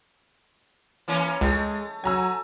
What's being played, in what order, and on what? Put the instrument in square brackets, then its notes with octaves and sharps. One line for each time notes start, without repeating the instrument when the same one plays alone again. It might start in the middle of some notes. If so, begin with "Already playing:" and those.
[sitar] E3 A#3 C#4
[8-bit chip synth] C#2 [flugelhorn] G#3 [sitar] A3
[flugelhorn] F#3 [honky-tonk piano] G#5 A#5 E6